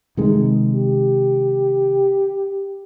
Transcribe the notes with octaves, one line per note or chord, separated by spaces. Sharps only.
C3 D#3 G#3
G4